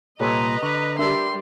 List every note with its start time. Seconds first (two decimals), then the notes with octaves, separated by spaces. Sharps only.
0.20 C2 A#2 G4 A4 B4 C#5 D#5 A#5
0.63 D3 B4 C#6
0.99 G3 D4 G4 A#4 E5 C6